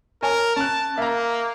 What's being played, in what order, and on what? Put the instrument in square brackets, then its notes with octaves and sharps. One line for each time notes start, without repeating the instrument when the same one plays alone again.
[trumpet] A#4 [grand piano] C#5 G#5 A5
[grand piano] C#4 F#6 [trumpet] A5
[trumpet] A#3 [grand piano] E5 A#5